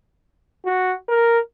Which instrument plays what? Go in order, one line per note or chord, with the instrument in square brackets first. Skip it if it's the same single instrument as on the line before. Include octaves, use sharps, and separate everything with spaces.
[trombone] F#4
A#4